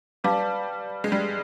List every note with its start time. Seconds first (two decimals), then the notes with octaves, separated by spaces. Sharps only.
0.24 G3 B4 D5 F5 A5 D6
1.04 G#3
1.12 G3